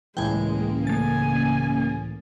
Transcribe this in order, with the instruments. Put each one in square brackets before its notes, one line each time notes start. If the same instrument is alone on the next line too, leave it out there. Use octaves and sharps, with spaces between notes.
[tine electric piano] C#2 A2 E3 [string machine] C#3 A#3 [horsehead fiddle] G#3 [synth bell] G5 G#5
[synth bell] A3 A6 [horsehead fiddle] G#5